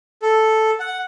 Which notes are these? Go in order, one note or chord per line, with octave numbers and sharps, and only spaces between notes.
A4
F#5